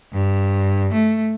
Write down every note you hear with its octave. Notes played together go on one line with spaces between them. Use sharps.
G2
A3